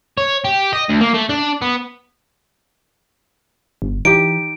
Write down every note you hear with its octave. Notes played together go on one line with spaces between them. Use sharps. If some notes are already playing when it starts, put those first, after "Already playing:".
C#5
G4
D#5
D2
A#3
A3
D4
B3
G1
E3 D#4 G4 D7